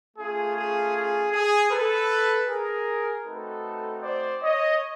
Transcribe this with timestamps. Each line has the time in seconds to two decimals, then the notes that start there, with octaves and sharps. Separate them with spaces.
0.17 A3 C#4 F4 G#4
0.56 G#4
0.95 G#4
1.32 G#4
1.71 A4 B4
2.48 G#4 A#4
3.25 A3 C4 D#4 F#4 A4 B4
4.02 C5 D5
4.41 C#5 D#5